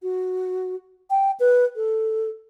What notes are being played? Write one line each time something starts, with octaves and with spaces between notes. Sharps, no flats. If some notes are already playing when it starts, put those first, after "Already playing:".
F#4
G5
B4
A4